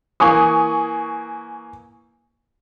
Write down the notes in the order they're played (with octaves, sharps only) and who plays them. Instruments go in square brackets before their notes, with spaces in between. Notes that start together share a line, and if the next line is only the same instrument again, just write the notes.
[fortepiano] E3 A#3 [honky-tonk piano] G#5 C#6 D#6